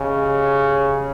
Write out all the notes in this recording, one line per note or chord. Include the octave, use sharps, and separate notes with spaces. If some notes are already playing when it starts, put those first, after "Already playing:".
Already playing: C#3 G4 D#5